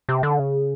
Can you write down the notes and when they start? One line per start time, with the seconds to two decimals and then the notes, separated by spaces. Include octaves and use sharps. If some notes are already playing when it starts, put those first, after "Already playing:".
0.09 C3
0.23 D3
0.39 C#3